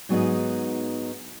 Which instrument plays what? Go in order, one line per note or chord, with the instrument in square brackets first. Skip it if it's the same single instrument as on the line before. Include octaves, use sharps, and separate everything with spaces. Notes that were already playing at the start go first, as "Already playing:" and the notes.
[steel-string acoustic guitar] G#2 F#3 B3 D4 D#4 G#4